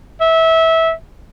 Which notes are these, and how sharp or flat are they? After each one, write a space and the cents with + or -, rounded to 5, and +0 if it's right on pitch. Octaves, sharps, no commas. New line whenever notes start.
E5 -20